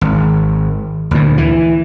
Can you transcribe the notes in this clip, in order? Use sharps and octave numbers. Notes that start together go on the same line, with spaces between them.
G#1
D2 A#2
E3